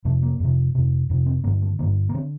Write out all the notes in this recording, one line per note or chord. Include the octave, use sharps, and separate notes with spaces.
F2 C3 A3
A#3
F2 C3
F2 C3
F2 C3
C4
G2 D3 A#3
A3
G2 D3 A#3
A#3
D3 C4